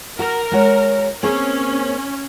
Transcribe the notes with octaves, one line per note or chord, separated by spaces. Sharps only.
F#4 A#4
G#3 F#4 C#5
A#3 C4 C#4 G#4